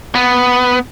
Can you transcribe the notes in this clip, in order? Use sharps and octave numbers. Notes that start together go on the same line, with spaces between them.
B3